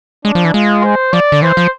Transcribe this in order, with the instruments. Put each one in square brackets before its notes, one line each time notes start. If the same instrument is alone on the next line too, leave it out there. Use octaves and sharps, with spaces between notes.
[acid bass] G#3 [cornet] D4
[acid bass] F3
E3
[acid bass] G#3 [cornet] F4
[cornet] C5
[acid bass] F3 [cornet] D5
[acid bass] D3
[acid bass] E3 [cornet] C5
[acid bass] F3